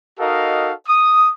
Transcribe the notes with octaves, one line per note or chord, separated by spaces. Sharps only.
D#4 F#4 A4 A#4 D#5 F5
D#6